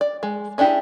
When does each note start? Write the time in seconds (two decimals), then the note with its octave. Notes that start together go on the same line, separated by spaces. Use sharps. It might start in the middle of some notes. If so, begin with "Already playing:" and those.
0.01 D5
0.23 G#3
0.58 C#4 D4 E4 G4 G#4